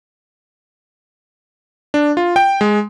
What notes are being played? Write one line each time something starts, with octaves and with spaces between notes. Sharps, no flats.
D4
F4
G5
G#3